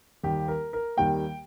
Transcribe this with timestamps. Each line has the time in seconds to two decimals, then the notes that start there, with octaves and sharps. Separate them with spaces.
0.23 D#2 D#3 G3 A#3 G4
0.48 A#4
0.73 A#4
0.97 D#2 D#3 G3 A#3 G5